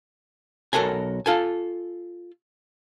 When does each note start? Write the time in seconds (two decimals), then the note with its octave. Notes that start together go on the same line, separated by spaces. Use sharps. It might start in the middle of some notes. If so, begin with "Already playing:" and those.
0.73 B1 F#4 A4 A#4 G#5
1.26 F4 A4 G#5